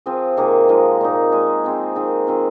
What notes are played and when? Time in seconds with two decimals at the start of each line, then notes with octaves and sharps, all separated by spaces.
0.06 F3 C4 G#4
0.37 C3 D#3 A#3 G#4
0.69 F3 G#3 D#4
1.01 A#2 A#3 D#4
1.32 G#3 F4 G#4
1.64 F3 C4 G#4
1.95 D#3 C4 G#4
2.27 D#3 C4 F4